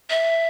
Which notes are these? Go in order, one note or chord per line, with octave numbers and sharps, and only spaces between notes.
E5